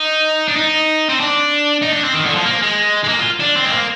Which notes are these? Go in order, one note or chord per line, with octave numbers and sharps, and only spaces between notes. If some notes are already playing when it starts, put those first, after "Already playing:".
Already playing: D#4
D4
D#4
C4
D4
D#4
D4
C4
D#3
D3
F3
A#3
G#3
G#3
A#3
F4
D4
C4
G#3
A#3